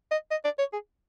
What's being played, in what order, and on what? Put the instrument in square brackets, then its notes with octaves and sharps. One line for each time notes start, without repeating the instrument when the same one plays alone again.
[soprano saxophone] D#5
D#5
D5
C#5
G#4